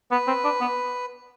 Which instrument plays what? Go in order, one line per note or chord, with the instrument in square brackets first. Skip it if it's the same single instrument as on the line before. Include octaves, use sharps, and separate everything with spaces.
[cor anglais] B3 [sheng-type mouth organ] B4
[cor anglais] C4
D4
B3